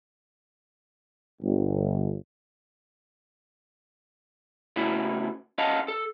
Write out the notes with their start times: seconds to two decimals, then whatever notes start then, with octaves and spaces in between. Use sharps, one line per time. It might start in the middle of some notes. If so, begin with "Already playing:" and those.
1.42 G1
4.76 A2 C#3 E4 F#4
5.58 C#4 D#5 F5 F#5 A5
5.88 A4